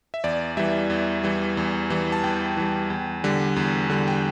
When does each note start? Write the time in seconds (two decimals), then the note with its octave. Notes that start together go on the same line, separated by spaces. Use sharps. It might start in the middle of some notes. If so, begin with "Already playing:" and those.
0.14 E5
0.24 E2 D5
0.57 E3 G3 E5
0.90 E2
1.24 E3 G3
1.57 E2
1.90 E3 G3
2.12 A5
2.24 E2 G5
2.57 E3 G3
2.90 E2
3.24 D3 G3
3.56 E2
3.90 D3 G3
4.08 G5